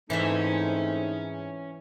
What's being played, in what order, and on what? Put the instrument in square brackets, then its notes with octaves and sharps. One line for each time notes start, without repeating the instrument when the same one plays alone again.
[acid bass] G#2 [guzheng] E3 C5 E5 [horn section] A3 C4 D#4 [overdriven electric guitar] C#4